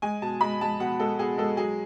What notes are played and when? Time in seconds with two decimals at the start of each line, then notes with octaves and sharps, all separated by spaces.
0.02 G#3 G#5
0.22 B2 A5
0.41 G#3 B5
0.61 G#3 A5
0.80 B2 F#5
1.00 G#3 A4
1.19 B2 G#4
1.38 G#3 A4
1.57 F#3 G#4